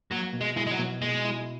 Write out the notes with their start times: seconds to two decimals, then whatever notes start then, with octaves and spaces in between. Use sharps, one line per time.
0.10 F#3 A#3
0.33 B2
0.41 G#3
0.56 G#3 E4
0.67 G#3
0.71 F#3
0.78 B2
1.02 B2 G#3
1.24 E4